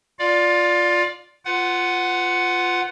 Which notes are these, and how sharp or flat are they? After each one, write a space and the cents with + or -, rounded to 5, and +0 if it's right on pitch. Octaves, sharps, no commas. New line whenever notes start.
F4 +0 D5 +0 F5 +25
F4 +0 B4 +25 F#5 +0